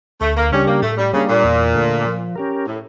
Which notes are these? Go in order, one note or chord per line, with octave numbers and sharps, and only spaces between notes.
D2 A3
A#3
C#3 G3 C#4 D4 G4
A#3
A2 A3
G3
C#3 G3 A#3 D4
A#2
E2
D3 A3
F3
C#4 G4 A#4
A2